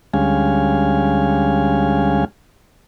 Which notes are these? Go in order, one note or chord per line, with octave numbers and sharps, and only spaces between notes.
D2 G3 G#3 C#4 F5 G#5